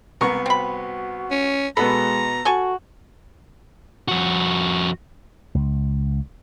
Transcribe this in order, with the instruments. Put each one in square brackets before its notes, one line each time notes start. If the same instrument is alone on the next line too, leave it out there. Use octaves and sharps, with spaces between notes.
[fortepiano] C2 B3 C#6 [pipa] A#4
[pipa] C4 B5 [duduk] F#4
[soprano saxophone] C#4
[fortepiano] B2 B3 A4 [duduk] G#3 [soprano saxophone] A#5 [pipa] B5
[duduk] F#4 [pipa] A4 G#5 C#6
[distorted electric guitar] F2 F#4
[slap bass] C#2